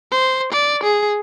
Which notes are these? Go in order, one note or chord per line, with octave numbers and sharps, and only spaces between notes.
C5
D5
G#4